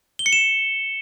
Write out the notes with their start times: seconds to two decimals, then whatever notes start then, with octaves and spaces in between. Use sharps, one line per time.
0.19 G7
0.26 C#7
0.33 E7